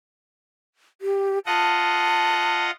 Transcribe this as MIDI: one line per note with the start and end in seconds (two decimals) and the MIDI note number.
1.01 1.39 67
1.46 2.71 65
1.46 2.71 75
1.46 2.71 78
1.46 2.65 81